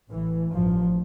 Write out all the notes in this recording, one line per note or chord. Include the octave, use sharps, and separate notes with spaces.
A1 A2 E3
A1 G2 F3